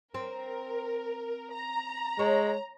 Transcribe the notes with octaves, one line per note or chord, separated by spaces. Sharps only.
C4 A#4
A#5
G#3 C#5